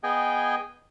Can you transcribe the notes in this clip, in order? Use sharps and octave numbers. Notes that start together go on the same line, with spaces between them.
B3 G#4 D#5 G5 G#5